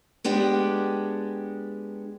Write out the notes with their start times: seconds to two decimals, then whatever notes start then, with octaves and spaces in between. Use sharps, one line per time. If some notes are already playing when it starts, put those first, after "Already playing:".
0.24 G#3 B3 D4 G4